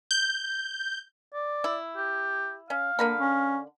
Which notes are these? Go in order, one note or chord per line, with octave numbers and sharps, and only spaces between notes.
G6
D5
E4
G4
C#4 F5
D3 A#3 A#4 B5
C#4